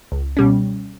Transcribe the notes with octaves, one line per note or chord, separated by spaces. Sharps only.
C#2
B2 G3 C#4